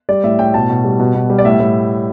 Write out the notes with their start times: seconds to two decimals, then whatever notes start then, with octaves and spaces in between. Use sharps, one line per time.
0.09 G3 D5
0.24 A2 E5
0.39 A2 G5
0.54 B2 A5
0.70 B2
0.84 G3
1.00 B2
1.15 B2
1.30 G3
1.39 D5
1.45 A2 E5
1.60 A2